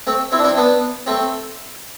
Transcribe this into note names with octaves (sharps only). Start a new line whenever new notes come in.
A3 C4
C4 E4
D4
C4 E4
B3 D4
A3 C4